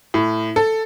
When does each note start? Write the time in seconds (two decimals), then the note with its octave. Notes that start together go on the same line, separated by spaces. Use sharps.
0.14 A2
0.56 A4